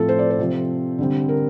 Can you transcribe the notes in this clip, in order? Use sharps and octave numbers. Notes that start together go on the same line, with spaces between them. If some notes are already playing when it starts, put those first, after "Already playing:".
Already playing: A2 F3 A3 C4 A4
C5
D5
C5
C3 F3 C4
D3 G3 C4
A#4